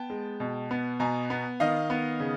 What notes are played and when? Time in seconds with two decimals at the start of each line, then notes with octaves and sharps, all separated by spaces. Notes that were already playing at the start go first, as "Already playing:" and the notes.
Already playing: B3 G5 A5
0.10 G#3
0.40 B2
0.71 B3
1.00 B2 G#5 A#5
1.30 B3
1.60 D#3 D#5 F5
1.90 B3
2.20 C#3